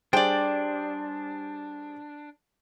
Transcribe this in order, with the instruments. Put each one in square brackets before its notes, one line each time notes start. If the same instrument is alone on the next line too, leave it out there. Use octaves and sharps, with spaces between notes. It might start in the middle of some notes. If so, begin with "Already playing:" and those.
[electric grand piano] G3 G#4 C5 [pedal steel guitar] D4 [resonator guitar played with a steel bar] D5 G5